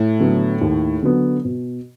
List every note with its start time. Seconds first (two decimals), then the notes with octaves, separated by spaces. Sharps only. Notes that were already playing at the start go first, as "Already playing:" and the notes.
Already playing: A2
0.20 D3 F#3 B3
0.61 D#2
1.02 D3 F#3 B3
1.45 B2